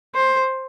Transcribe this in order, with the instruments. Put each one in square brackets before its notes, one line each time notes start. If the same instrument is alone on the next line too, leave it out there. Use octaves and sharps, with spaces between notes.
[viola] C5